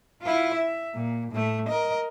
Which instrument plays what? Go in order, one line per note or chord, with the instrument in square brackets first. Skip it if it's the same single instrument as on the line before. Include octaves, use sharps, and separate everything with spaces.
[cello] E4 F4
E5
A#2
A2 A3
A#4 D#5